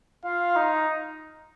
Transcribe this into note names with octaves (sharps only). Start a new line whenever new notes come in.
F4 F5
D#4